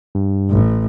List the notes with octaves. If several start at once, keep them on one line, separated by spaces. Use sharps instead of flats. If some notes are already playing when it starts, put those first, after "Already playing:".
G2
A1